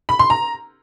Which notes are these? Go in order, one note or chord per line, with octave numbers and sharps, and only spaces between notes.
B5
C6
A#5